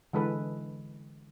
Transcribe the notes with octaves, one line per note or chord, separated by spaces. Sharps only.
D3 E3 G#3 A4 B4